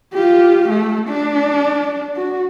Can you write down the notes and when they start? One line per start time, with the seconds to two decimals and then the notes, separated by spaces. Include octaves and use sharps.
0.13 F4 G4
0.69 A3
1.09 D4
2.16 F#4